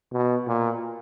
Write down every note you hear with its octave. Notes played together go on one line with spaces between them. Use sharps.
B2
A#2